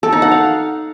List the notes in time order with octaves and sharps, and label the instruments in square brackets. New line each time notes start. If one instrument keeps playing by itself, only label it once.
[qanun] A4
D#4
F#5
F5